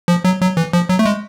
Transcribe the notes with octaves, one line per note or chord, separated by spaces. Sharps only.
F3
F#3
F#3
E3
F3
F#3
A3
G#3